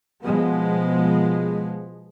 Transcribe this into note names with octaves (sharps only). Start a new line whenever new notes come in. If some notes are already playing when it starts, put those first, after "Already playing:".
B2 F3 G#3 B3